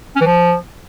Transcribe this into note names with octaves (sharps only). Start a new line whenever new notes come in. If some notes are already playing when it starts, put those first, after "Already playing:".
C#4
E3
F3